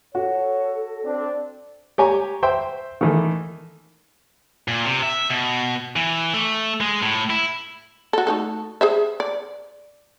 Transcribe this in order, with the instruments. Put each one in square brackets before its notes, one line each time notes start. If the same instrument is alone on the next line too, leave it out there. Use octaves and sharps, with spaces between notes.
[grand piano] F#4 [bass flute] A4 [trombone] C#5
[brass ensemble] C4 D4
[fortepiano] G4 C#5 G#5 A#5
C5 E5 G5 C6
D#3 E3 A3
[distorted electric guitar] A#2
C3
E5
B2
E3
A3
G#3
A2
E4
[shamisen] F#4 A4
A3 D#4 A4
G#4 C5 E5
D5